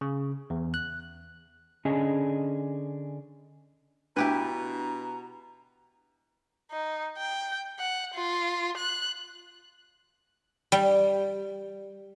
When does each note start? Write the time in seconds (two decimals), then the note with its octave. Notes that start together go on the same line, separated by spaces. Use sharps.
0.01 C#3
0.50 E2
0.74 F#6
1.85 D3 C#4 D4 G#4 C#5 D#5
4.17 B2 D4 E4 G4 B4 A#5
6.72 D#4
7.18 G5
7.79 F#5
8.14 F4
8.78 F#6
10.72 G3